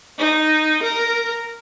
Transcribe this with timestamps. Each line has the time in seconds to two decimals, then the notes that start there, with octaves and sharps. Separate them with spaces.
0.18 D#4
0.83 A#4